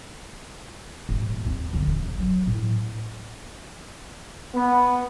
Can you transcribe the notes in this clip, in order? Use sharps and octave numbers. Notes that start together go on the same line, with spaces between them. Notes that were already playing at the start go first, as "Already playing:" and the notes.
D#1 G#2
D#2 C4
E2 D3
D#1 C#4
F#3
A2
B3